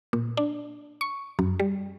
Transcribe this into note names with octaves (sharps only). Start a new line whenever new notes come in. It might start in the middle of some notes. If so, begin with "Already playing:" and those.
A#2
D4
C#6
F#2
G3